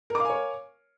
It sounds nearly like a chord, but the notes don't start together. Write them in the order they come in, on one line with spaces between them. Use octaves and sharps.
A#4 D6 F5 G#5 C#5